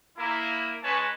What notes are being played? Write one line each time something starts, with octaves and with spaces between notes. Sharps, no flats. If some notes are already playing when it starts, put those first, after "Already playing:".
A#3 E4
G#3 C#4 B4 C#5 A5